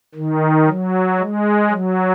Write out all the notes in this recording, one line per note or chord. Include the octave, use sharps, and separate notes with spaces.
D#3
F#3
G#3
F#3